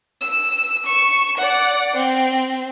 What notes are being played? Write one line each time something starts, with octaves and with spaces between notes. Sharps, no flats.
E6
C#6 E7
D5 F#5
C4